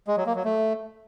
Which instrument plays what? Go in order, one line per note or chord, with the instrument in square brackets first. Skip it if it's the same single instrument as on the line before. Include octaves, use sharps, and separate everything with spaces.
[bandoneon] G#3
F#3
A#3
F#3
A3